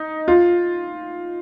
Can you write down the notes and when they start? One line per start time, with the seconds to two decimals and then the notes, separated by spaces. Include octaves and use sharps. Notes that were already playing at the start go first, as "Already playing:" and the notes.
Already playing: D#4
0.28 F4